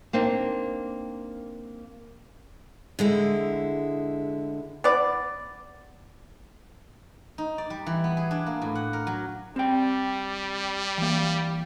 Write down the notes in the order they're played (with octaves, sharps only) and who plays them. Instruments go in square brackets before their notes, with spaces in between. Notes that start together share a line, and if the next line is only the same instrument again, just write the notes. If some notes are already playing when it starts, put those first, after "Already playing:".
[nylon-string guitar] A#3 C4 D4 D#4
[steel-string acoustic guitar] D3 G#3 E4
[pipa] B3 D5
[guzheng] D#4
D5
G3
E3
B3
G#4
D4
A#3
A2
F#5
A#4
F#3
[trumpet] G3 [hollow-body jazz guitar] C4 G5
[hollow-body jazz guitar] E3 A#3